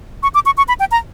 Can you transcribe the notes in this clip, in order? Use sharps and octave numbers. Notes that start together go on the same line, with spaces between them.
C#6
D6
C#6
C#6
B5
G5
A#5